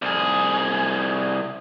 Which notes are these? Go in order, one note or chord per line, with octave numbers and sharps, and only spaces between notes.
C2 G#4